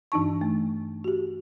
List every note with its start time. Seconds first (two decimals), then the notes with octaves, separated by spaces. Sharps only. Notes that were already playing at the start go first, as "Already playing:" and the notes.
0.12 G2 E3 D4 D#4 A5 C#6
0.41 A3
1.04 F#4 G4